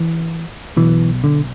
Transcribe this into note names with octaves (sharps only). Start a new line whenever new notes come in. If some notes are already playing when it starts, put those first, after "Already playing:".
Already playing: E3
B1 B2 E3
D3